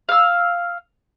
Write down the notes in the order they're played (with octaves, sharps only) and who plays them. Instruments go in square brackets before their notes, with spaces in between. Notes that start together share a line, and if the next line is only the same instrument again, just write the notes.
[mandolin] F5 E6